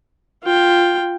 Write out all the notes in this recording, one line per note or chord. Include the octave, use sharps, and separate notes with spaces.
F4 G5